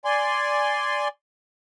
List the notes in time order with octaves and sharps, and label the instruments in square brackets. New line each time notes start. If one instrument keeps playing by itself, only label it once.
[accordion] D5 G#5 C6